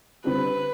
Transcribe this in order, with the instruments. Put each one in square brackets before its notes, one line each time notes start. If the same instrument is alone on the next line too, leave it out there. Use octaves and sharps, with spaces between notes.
[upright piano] D3 G3 C4 G4 [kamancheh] B4